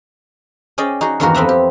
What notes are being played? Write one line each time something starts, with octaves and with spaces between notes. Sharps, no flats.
C#4 G#4 D5 D#5 G5
D#4 F#4 G#4
E2 G2 D#3 A#3 F#4 A#4
F2 B3 C4 B4 E5 A#5
G4